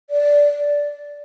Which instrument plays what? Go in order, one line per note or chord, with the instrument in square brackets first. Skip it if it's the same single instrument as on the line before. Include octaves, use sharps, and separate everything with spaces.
[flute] D5